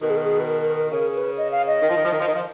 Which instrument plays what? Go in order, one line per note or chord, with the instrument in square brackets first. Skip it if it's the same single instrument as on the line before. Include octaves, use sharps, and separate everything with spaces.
[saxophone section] B2 D#3 [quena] A#4
[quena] G#4
A#4
G#4
B4
A#4
A#4
A#4
[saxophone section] C#3 [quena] A#4
[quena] B4
D#5
F5
D#5
[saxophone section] D#3
F3
D#3
F3
D#3
F3
D#3
F3